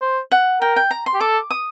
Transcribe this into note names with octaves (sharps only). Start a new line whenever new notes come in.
C5
F#5
A#4 G5
G5
A#5
C6
G4
A4 D6
D#6